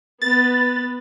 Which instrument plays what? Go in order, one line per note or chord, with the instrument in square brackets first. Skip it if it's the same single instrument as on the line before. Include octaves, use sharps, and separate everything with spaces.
[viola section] B3 B4 [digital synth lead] A6